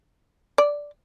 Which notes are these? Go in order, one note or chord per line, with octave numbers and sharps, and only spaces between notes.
D5